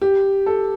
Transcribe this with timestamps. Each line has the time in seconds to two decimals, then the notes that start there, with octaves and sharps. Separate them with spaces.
0.02 G4
0.46 A4